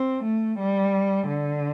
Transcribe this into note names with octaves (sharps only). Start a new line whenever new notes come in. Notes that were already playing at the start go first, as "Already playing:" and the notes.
Already playing: C4
A3
G3
D3